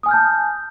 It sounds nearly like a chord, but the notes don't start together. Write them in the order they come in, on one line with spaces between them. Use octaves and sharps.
D#6 G#5 F6 G6 A5